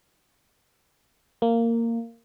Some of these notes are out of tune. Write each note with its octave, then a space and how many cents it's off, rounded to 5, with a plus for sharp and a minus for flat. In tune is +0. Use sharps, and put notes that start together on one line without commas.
A#3 -15